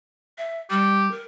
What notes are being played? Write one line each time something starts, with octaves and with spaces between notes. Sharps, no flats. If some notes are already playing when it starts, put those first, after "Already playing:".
E5
G3 G4
A#4